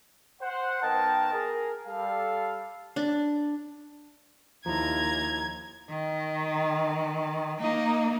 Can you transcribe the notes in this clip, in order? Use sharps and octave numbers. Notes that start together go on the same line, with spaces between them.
C5 F#5
D#3 B3 A#4 D#5 G5 A5
G#4 A#4
G3 A4 F5
D4
D#2 F3 E4 A#5 G#6
D#3
A#3 D#4